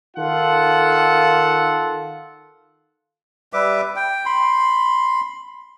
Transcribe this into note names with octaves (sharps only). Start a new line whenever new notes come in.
D#3 F4 A4 F#5
G3 B4 E5 D6
G5
B5 C6